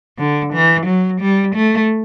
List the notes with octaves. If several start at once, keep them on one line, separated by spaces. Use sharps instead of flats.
D3
E3
F#3
G3
A3